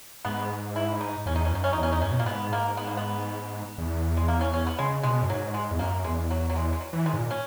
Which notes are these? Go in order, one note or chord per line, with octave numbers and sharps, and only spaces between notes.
G#2 B3
E4
D#4
E2 C#4
D#4
C#4
F#2 D#4
C#4
E2 D#4
C#4
D#4
F#2 C#4
B2
A#2 A#3
G#2 B3
A#3
B3
A#3
B3
E2
G#3
A#3
C#4
C#4
B3
C#3 G#3
B2 G#3
F#2
G#2 F#3
G#3
E2
F#2 A#3
E2 G#3
F#3
F#3
G#3
G#3
F#3
E3
D#3 G#3
G#2
A#2
C#4